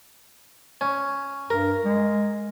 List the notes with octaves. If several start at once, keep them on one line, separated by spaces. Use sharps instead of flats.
C#4
G2 A#4
G#3